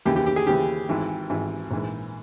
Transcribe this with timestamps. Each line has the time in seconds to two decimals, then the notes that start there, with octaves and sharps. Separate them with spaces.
0.05 D#2 C#3 E3 G4
0.16 G4
0.26 G4
0.36 G#4
0.47 D#2 C#3 E3 G4
0.89 G#1 G#2 E3
1.30 G#1 G#2 E3
1.71 A#1 G#2 E3